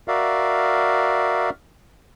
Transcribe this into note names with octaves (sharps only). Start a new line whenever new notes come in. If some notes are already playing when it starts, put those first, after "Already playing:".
F#4 A#4 D5 E5 F5